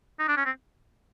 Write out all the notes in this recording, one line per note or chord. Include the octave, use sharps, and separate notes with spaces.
D#4
D4
C#4
C4